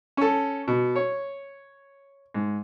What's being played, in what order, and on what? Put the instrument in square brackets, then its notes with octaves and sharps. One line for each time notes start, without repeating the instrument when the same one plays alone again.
[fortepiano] C#4 A4
B2
C#5
G#2